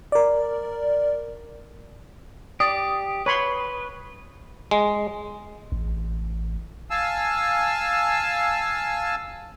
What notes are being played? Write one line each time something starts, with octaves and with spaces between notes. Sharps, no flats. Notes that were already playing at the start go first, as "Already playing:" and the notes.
A#4 D5
G4 D5 D#6
B4 C#5 B5 C6
G#3
A1
F5 G#5 A5 E6